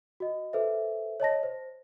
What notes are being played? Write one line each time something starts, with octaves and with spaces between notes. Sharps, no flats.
F#4 D#5
A4 B4 C5 E5
C#5 D#5 A5 A#6
C5